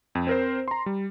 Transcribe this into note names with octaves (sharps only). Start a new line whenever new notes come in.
F2
C4 A#4 C5
A#5 C6
G3